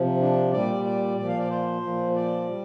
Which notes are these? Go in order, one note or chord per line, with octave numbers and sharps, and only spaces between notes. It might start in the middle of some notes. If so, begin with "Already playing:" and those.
Already playing: C3 F3
D4
A#2 G3 D5
D5
A#2 F3 D5
F5
D5
C5
A#2 F3
D5
G3